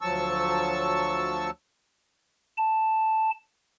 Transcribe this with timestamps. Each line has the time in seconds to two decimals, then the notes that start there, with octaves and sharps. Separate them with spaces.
0.01 D2 F3 F#3 A5 C#6 E6
2.58 A5